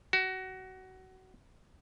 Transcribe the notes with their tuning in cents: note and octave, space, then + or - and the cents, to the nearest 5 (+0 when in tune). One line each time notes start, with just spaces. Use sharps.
F#4 +25